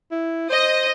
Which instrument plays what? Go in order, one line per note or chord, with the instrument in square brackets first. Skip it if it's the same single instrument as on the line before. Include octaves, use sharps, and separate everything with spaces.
[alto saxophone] E4
[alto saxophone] C5 [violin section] D#5